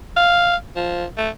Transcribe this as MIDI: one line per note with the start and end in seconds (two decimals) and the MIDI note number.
0.16 0.56 77
0.76 1.05 53
1.18 1.29 57